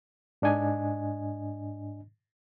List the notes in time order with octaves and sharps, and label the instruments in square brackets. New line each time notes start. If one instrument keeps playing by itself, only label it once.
[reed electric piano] G#2 D4 D#5 G#5